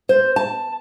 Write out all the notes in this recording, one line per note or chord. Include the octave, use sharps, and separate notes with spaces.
C5
A5